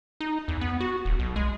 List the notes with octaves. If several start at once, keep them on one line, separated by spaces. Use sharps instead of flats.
D#4
E2
B3
F#4
D#1
B1
G#3